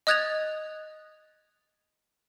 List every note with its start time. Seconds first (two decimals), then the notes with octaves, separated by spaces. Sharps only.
0.07 D#5 D#6 F#6 G#6 A6 F7